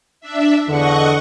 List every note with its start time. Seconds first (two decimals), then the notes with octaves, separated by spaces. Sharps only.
0.21 D4 E5
0.69 E2 D3 D#5 F#5 C#6